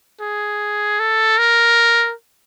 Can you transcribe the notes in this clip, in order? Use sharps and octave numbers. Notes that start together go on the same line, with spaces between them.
G#4
A4
A#4